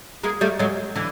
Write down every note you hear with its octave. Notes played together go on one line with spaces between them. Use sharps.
G#3 A#3
G3 A3
F#3 G#3
D3 E3